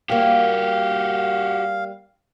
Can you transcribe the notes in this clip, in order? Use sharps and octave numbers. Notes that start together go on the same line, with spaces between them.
G3 A#3 F#4 G4 F5